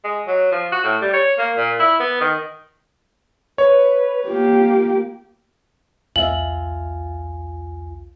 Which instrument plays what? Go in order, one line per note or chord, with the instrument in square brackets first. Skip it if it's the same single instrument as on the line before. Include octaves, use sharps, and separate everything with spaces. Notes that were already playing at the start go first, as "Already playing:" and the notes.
[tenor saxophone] G#3
F#3
F3
F#4
A2
G3
C#5
A#3
A#2
E4
B3
D#3
[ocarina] B4 [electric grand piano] C#5
[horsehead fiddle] A#3 G4 [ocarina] F4
[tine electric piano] B1 E2 G#5 [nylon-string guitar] F4 D#5 E5 [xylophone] F#7